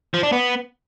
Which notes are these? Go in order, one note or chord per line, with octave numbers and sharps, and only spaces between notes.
F3
D4
B3